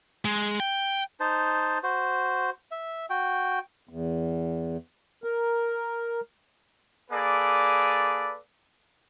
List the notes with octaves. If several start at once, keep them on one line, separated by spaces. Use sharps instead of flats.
G#3
G5
D#4 C5 A5
F#4 C5
E5
F#4 G5
E2
A#4
A#3 G#4 A4 B4 D5